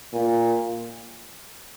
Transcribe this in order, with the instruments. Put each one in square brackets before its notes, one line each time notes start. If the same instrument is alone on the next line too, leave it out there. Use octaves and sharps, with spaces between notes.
[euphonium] A#2